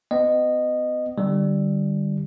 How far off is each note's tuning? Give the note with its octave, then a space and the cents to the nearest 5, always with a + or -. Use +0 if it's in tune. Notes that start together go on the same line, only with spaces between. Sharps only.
B3 +40 D#5 -15
D3 +35 G3 +0